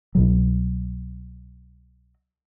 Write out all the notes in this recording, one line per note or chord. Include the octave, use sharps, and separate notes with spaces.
C2 B2 F#3